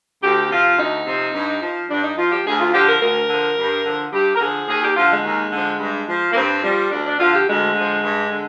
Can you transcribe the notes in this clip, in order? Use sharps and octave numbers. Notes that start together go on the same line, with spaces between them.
D2 G4
C3 F3 F4
D2 D#4
C3 F3
G2
F3
G2 D4
D#4
F3 F4
G4
D2 G#4
F4
D3 F3 G4
A#4
D2 A#4
D3 F3
G2
D3 F3
G2 G4
A#4
D3 F3 G#4
D#2 G#4
G4
D3 F3 F4
G#3
D#2
D3 F3
G2
F3
A#3
G2 C4
F3 G3
D2 D4
D4
D3 F3 F4
G4
D2 G#3
D3 F3
G2
D3